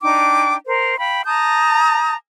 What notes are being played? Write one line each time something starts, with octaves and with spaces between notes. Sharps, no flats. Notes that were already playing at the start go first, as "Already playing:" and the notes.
D4 D#4 G5 D6
A#4 C5
F5 G5 B5
A5 A#5 D#6 G6